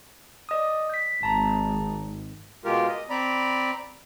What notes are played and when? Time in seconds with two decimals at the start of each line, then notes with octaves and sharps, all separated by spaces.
0.49 D5 D#5 D#6
0.90 G6 B6
1.23 G#1 A5 A#5
2.65 B2 G#3 F4 G4 A#4
2.88 D#5
3.10 C4 D5 A#5 B5